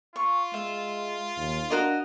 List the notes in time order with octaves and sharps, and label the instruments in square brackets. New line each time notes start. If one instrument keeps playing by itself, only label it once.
[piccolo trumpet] F4 [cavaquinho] C#6
[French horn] G#3 [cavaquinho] E5
[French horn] D#2
[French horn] D4 [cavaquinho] F#4 A#4 D#5